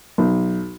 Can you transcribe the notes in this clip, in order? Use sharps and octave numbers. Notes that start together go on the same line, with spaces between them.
B1